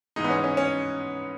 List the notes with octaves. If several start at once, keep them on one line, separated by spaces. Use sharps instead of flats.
G#2 E3 G#3 D#4
B3
C#4
C#4
C#4